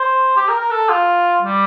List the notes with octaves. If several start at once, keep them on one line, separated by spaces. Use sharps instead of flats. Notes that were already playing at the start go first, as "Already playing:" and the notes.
Already playing: C5
G4
A#4
A#4
A4
F4
G3